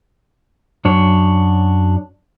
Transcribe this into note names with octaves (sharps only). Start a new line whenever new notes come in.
F#2 D4 C#5